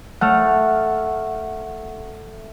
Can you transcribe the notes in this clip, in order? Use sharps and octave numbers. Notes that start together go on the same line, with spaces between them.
A3 F#5 F6